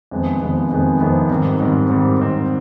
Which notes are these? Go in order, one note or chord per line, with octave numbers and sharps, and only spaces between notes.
F2 C3 D#3 G#3 B3
F2 C3 D#3 G#3 B3
F2 C3 D#3 G#3 B3
F2 C3 D#3 G#3 B3
G#2 D#3 G3 C4
G#2 D#3 G3 C4
G#2 D#3 G3 C4
G#2 D#3 G3 C4